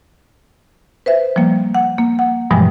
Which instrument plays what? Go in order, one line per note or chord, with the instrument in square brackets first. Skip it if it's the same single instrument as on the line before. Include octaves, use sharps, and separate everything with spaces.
[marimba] B4 C5 E5
F3 G3 A#3
F#5
A#3
F#5
G2 B2 E3 F3 G3 G#3